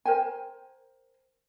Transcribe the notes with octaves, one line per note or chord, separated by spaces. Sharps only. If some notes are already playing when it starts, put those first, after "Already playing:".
A#4 C5 G5 G#5